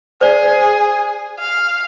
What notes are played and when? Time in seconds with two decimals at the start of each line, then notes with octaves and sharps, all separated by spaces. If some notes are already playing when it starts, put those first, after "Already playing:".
0.21 G#4 C5 D5
1.39 F5